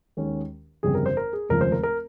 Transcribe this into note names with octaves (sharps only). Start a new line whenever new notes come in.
D#2 D#3 G#3 C#4
G1 F2 C#3 G3 C4 G#4
A#4
C5
A#4
G#4
F1 D#2 C#3 F3 G#3 A#4
C5
A#4
A#4